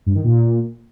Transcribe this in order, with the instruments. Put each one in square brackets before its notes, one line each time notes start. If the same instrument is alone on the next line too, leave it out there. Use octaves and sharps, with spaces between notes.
[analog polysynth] G2
D#3
A#2